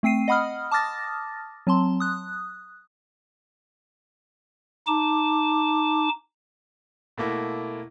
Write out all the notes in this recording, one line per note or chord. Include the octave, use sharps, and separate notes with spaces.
A3 C4 G5 C7 D#7
D#5 F#5 B5 D#6 F6
A5 D6 D#6 F6 A6 A#6
F#3 C4 A5 C6
D#6 F#6
D#4 A5 D6
B2 A3 A#3 E4